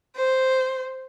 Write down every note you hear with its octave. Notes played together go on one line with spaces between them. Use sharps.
C5